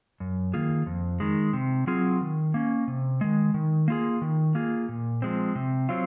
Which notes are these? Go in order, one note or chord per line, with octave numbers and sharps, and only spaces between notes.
F#2
D#3 A#3 F4 G#4
F2
D#3 G#3
C3
F#3 C4 F4 G#4
D#3
A#3 C#4
C3
D#3 G#3
D#3
A#3 F4 G#4
D#3
A#3 F4 G#4
A#2
F3 G#3 C4
C3
F#3 C4 F4